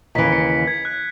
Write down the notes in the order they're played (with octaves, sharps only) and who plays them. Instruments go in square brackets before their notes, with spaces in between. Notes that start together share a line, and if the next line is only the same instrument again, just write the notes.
[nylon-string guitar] D#2 C#3 E3 [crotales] B6
[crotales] C#7
B6
G#6
F#6